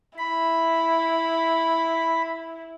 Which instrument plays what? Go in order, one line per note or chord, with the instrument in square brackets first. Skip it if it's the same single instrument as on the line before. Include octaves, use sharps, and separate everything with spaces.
[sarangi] E4 [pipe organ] B5